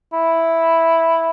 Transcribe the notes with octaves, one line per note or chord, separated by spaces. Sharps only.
E4